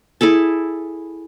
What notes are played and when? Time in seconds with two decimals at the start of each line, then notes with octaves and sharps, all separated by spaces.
0.21 E4 G#4 A4 A5